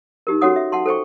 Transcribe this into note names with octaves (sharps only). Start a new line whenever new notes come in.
D#4 G4 A#4
C#4 F#4 A4 C#5 F#5 D#6
E5
F#5 A5 C6
A4 C5 G5 C#6